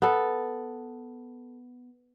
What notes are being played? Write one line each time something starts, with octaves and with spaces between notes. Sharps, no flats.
B3 A4